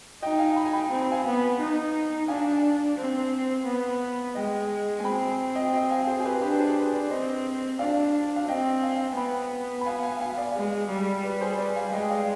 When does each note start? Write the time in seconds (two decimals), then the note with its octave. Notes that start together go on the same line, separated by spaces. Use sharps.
0.22 D#4 D#5 G5
0.39 F5 G#5
0.56 G5 B5
0.65 G#5
0.73 G5 B5
0.91 C4 G#5
1.01 B5
1.12 F5 G#5
1.26 B3
1.60 D#4
2.28 D4 F5 G#5
2.98 C4
3.66 B3
4.35 G#3 D#5 G5
4.99 G#5
5.04 C4 G5 B5
5.55 D#5 G5
5.73 D#5 G5
5.91 F5 G#5
6.07 G#4 C5
6.20 G#4
6.25 G4 B4
6.42 D4 G4 B4
6.59 G#4 C5
6.72 C5
6.76 G4 B4
6.93 B4 D5
7.10 C4 C5 D#5
7.79 D4 D5 F5
8.36 F5
8.48 C4 D#5 G5
8.82 F5 G#5
9.17 B3 G5 B5
9.81 B5
9.86 F5 G#5
10.03 F5 G#5
10.20 F5 G#5
10.38 D5 F5
10.56 G#3
10.89 G3
11.23 B4 D5
11.41 G#4 C5
11.58 B4 D5
11.76 F5 G#5
11.93 G#3 D#5 G5
12.10 D5 F5